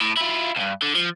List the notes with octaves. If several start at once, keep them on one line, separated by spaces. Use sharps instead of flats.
A2
E4 F4
C#2 G2
D3
F3